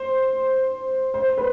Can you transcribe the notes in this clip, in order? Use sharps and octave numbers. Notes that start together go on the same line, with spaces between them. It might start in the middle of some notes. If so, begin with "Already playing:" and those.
Already playing: C5
C5
B4